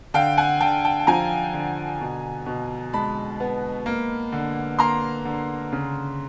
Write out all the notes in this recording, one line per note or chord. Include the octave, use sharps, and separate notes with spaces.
D3 F5 G5
F#5 G#5
D3 G5 A5
G5 A5
A5
F3 G#5 A#5
D3
B2
B2
G#3 A5 B5
B3
A#3
D3
A#3 A#5 C6
D3
C#3